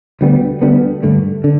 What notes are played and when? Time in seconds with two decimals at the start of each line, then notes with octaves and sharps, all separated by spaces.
0.21 D2 D3 G3 B3
0.62 D2 D3 G3 B3
1.03 G2 D3 A3
1.44 D3